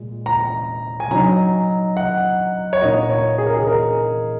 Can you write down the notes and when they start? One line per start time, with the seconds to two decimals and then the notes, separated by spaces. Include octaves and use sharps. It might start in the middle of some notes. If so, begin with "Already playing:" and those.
Already playing: A#2 G#3
0.26 A#5
1.00 G#5
1.11 F#3 D#4 A#5
1.97 F#5
2.73 C#5
2.82 A#2 A#3 D#4 D#5
3.10 C#5
3.38 G#4
3.46 A#4
3.54 G#4
3.67 A#4